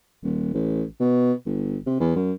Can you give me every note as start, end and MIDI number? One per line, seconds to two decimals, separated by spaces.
0.24 0.51 27
0.54 0.83 33
1.00 1.33 47
1.46 1.77 31
1.86 1.98 48
2.00 2.12 40
2.16 2.32 42